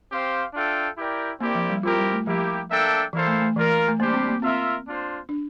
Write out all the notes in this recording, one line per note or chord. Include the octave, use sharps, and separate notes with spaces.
C4 G4 C5 F5
D4 F4 A4 E5 G5
E4 G4 A#4 D5 G5
A#3 C4 E4 G4 A#4 D5
F3
G3
C4 E4 F4 G4 A#4
G3
A3
F3 A#3 E4 G4
A#3 D4 A4 E5 G5
E3 A#3 E4 A4 C5 F5
A3
A3
E3 A#3 F4 A#4
A3
G3 A#3 D4 G4 C5
C4
A#3
C4 F4 A#4 E5
D4 F4 C5
D4